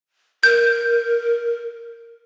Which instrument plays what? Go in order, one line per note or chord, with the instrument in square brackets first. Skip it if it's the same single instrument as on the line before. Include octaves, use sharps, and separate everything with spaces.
[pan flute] A#4 [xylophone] G6